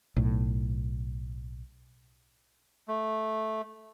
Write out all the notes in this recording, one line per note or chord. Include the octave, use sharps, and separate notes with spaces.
B1 A2
A3